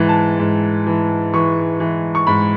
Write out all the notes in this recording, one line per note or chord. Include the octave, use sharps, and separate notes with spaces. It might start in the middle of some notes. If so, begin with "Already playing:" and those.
Already playing: G#2 E3
A5
G#2
E3
E3 C#6
E3
C#6
G#2 B5